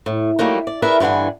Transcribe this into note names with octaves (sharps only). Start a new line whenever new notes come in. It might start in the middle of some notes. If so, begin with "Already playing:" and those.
A2
F#3 G3 A3 A#3 D#4
D5
E4 G#4 A#4 B4 D5 E5
G2 D3 E3 F#5 G#5